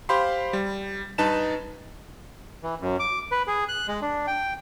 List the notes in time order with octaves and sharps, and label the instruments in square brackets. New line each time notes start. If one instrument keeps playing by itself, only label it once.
[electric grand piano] G4 C5 F5 B5 C6
G3
G2 D#4 B4 A5 E7
[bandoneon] E3
F#2
D6
B4
G#4
F#6
G#3
D4
G5